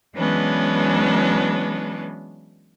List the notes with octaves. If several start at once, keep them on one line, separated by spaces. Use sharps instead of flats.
E3 F#3 G#3 B3 C#4 D4